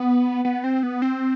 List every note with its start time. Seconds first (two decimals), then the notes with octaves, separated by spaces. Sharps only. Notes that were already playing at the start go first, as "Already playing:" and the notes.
Already playing: B3
0.45 B3
0.64 C4
0.83 B3
1.02 C4